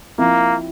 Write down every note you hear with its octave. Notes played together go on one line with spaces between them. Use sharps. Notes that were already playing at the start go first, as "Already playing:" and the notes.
F3 A#3 C4 E4